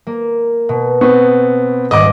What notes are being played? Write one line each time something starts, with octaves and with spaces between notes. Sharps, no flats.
A#3
B2
B3 C4 C#6
D#1 G#2 D#5 D6